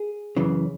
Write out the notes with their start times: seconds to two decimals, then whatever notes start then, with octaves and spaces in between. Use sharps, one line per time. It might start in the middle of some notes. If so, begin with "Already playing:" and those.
Already playing: G#4
0.36 F#2 C#3 E3